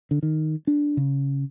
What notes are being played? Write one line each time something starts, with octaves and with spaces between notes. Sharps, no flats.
D3
D#3
D4
C#3